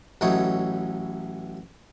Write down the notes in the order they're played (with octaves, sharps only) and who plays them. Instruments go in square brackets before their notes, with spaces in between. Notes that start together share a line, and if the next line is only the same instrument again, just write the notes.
[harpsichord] A1 F#3 D#4 E4 C#5